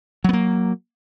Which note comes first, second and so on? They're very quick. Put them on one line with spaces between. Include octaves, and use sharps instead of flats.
F#3 B3 A#3